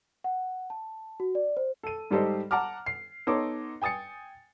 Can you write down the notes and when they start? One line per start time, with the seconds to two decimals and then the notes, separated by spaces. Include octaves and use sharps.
0.24 F#5
0.70 A5
1.20 F#4
1.35 D5
1.57 C5
1.83 A4 D#7
2.11 G#2 G3 G4 A4 C5 D#5
2.51 F#5 A5 A#5 D6 F6
2.86 C7
3.27 B3 D#4 A4 C#5 C6 D6
3.81 G5 G#5 D#6 A6 C#7